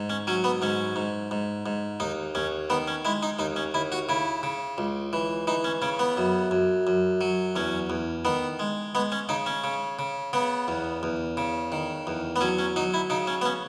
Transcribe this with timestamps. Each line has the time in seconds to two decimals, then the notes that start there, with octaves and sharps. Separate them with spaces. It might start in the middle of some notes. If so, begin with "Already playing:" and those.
Already playing: G#2
0.10 C#4
0.27 F#3 C#4
0.44 B3
0.62 G#2 C#4
0.96 G#2
1.31 G#2
1.66 G#2
2.00 D#2 D#4
2.35 D#2 C#4
2.70 D#3 B3
2.88 C#4
3.05 G#3 E4
3.23 D#4
3.39 D#2 D#4
3.56 C#4
3.74 D#2 E4
3.92 F#4
4.09 C#3 E4
4.43 C#3
4.78 C#2
5.13 E3
5.47 E3 D#4
5.64 C#4
5.82 C#3 C#4
5.99 B3
6.17 F#2
6.51 F#2
6.87 F#2
7.21 F#3
7.56 E2 C#4
7.90 E2
8.25 D#3 B3
8.59 G#3
8.95 G#3 B3
9.12 C#4
9.29 C#3 D#4
9.46 C#4
9.64 C#3
9.99 C#3
10.33 C#3 B3
10.68 E2
11.03 E2
11.37 C#3
11.72 D#3
12.07 E2
12.36 B3
12.41 F#3 C#4
12.59 C#4
12.76 F#3 D#4
12.94 E4
13.10 C#3 D#4
13.27 C#4
13.42 B3
13.46 C#4